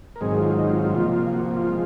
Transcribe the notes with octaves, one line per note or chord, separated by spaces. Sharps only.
A#4
G#2 D#3 F#3 C4 G#4
F4
D#4
F4
F4
C3 F3 A#3 F4
F4
F#4
F4
G#3 C4